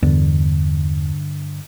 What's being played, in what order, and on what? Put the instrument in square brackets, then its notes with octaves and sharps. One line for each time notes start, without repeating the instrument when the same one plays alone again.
[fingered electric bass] E2 B3 D4 [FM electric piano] G2 D3